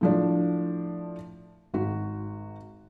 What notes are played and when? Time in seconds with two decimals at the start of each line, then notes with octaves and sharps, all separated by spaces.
0.01 A2 F3 D4
1.74 G#1 F#4